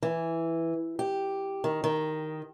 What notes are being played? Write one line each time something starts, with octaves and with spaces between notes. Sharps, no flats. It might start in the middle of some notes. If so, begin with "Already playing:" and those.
E3
G4
D#3
D#3